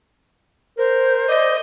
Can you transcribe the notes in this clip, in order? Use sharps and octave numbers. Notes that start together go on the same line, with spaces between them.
A#4 C5
D5 D#5